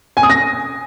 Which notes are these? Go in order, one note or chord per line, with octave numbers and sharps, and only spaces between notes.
G#5
D#6
A#6